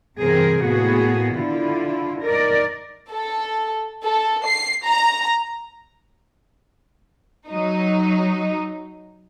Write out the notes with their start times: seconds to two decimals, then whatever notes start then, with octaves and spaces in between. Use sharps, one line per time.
0.19 G2 C3 E3 C4 G#4 A#4
0.64 A2 A#3 B3 F#4 G#4
1.35 D3 E4 F4
2.22 D#4 A#4 D5
3.11 A4
4.05 A4
4.46 C7
4.85 A#5
7.47 F#3 D#4